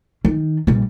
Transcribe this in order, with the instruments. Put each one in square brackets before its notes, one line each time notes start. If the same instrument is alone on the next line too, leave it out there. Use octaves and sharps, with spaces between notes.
[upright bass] D#3
A#1 G3